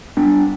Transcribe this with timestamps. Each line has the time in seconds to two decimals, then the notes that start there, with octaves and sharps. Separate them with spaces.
0.17 G3 B3 D4